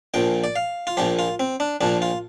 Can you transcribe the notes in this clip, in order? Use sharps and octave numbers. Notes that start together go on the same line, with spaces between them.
A#1 A#2 F3 G5
D5
F5
F4
A#1 A#2 F3 G4
F4
C4
D4
A#1 A#2 F3 D4
F4